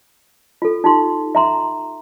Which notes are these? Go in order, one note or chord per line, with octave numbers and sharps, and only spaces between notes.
F4 A4
D#4 F4 G4 C6
E5 A#5 C6